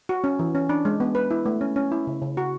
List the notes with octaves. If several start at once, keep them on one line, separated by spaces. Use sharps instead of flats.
F#4
C#4
E3
C#4
D4
G#3
B3
B4
E4
A3
C#4
C#4
E4
C#3
C#3
F#4